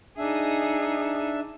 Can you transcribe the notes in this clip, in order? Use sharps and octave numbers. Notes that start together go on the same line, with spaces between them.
D4 D#4 G#4 E5